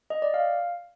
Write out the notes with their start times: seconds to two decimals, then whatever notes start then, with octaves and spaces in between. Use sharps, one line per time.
0.10 D#5
0.22 D5
0.34 F5